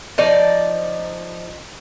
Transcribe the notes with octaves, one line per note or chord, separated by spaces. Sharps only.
F3 D#4 D5